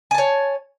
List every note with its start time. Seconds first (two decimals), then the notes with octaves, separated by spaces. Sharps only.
0.11 G#5
0.15 A5
0.18 C#5